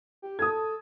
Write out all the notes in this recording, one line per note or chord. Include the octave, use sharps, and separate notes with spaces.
G4
A4 D#6 G#6